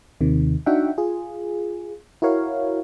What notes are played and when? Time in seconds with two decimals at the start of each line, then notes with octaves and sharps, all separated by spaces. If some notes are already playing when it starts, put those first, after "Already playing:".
0.21 D#2 C3 D#3
0.66 D4 D#4 F#4 E5 F#5 G5
0.98 F4 G#4
2.22 E4 F#4 A#4 C#5 F5